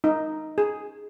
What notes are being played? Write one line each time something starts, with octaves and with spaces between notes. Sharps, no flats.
D#4
G#4